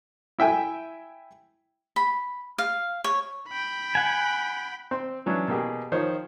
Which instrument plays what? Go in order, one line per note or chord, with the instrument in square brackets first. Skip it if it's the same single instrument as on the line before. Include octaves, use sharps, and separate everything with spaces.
[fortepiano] E4 E5 G5 G#5
[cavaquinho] B5
F5
C#5
[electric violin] G5 B5
[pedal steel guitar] F#5 G#5
[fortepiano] C4 C6
E3 F#3 C#4 D4
B2 A#3 G4 G#4
D#3 F3 C5 C#5